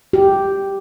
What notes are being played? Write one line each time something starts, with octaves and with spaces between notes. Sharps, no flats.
G4